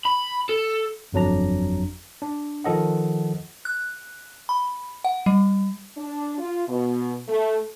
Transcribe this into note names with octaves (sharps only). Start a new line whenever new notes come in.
B5
A4
G1 F2 F#3 D4 A#5
D4
D#3 F3 A4 D#5 F#5
F#6
B5
F#5
G3
D4
F4
B2
A3